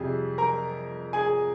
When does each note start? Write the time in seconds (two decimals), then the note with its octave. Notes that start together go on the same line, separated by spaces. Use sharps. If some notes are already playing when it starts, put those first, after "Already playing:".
Already playing: F2 C3 G3 G#4
0.38 A#4 A#5
1.13 G#4 G#5